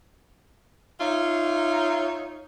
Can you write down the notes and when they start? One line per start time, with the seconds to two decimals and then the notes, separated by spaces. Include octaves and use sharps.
1.00 D#4 F4 C#5 E5